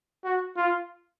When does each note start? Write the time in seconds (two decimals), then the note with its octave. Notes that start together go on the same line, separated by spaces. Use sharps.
0.24 F#4
0.57 F4